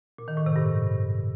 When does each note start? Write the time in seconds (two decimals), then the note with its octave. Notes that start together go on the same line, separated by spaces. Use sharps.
0.18 A#2
0.28 D#3
0.37 A2
0.46 C3
0.56 G2